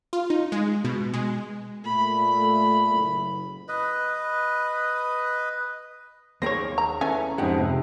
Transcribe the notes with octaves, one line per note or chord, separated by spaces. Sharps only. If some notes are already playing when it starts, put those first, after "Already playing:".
F4
D#4
G#3
B2
G#3
A#2 A3 B5
F#1
B4 D#5
D#2 A#3 G#4 C5 C#5 A#6
A#5
E3 A3 C#4 G#5
F2 G#2 G#3 G4 F#5
C3